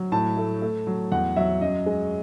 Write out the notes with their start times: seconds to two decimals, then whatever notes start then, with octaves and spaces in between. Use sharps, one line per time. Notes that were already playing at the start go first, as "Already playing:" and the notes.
Already playing: F#3
0.12 A2 A5
0.37 A3
0.62 A3
0.87 F#3
1.12 E2 F#5
1.36 F#3 E5
1.61 F#2 D#5
1.86 G#3